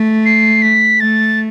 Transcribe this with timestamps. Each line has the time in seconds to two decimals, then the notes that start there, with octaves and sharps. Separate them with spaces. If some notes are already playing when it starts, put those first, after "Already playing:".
Already playing: A3
0.25 C7
0.62 B6
1.00 A3 A6